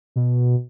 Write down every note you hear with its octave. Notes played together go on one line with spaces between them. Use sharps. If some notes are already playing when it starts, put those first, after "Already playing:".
B2